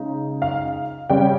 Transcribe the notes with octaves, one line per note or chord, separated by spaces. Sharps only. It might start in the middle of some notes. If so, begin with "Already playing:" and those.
Already playing: C#3 G#3 D#4
F5
C#3 G3 C#4 G5